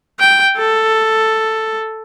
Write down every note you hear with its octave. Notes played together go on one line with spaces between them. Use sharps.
G5
A4